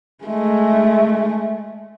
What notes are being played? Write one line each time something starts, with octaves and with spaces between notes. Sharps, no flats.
G#3 A3